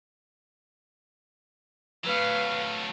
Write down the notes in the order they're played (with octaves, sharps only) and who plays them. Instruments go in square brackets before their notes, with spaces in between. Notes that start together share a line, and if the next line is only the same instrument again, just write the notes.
[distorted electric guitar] F#3 A3 [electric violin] B4 F5